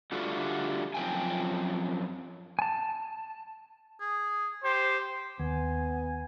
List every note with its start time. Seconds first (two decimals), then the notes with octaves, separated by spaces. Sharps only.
0.12 D3 G3 A3 F4 F#4 A4
0.94 F#2 F3 C4 C5 G5 G#5
2.59 G#5 A5
4.00 G#4
4.64 G4 C5
5.39 D#2 B3 G#5